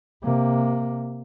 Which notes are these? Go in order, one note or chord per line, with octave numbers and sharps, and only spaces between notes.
C3 A#3